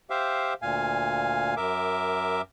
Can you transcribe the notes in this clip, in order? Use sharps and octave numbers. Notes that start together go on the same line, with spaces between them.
G4 C5 E5 F5
D2 A#2 F5 G#5
F#2 A#4 E5 D6